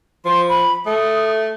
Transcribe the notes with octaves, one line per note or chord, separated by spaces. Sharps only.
F3 C6
B5
A3 D#6